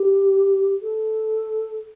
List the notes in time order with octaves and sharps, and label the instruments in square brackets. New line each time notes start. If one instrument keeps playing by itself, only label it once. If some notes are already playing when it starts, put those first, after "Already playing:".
Already playing: [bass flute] G4
A4